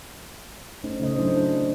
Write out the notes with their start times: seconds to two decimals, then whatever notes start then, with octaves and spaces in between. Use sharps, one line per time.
0.84 A3 C#4 D#4 C5
1.00 C#3 A3 D#5
1.16 F#3 D4 E4 A4 C5